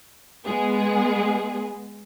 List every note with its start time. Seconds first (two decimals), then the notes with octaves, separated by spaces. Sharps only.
0.45 G#3 B3 G#4